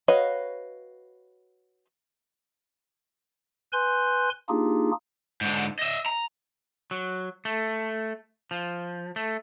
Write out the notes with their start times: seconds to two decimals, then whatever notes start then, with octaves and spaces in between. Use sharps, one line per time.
0.08 F#4 B4 C#5 D#5 F5
3.73 B4 G#5 C6 F#6 G6
4.49 A#3 D4 D#4 F4 G4 G#4
5.41 G#2 D3
5.79 D#5 E5
6.06 A#5
6.91 F#3
7.45 A3
8.51 F3
9.16 A3